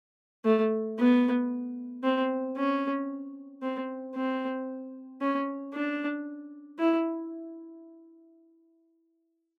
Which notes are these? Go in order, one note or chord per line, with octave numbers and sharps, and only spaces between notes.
A3
B3
C4
C#4
C4
C4
C#4
D4
E4